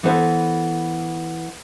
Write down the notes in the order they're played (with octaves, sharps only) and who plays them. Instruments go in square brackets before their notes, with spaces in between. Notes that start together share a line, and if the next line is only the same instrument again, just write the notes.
[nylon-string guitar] E3 B3 A4 C5 D#5 E5